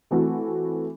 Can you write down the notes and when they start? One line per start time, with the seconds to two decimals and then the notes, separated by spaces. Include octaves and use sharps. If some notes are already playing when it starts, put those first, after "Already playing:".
0.11 E3 A3 C4 F#4 A4